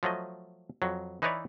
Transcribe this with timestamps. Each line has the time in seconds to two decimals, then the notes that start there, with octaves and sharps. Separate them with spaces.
0.03 F3 F#3 A3 D#5
0.82 F2 F#3
1.22 E3 D#4 E4 B4 C#5 D5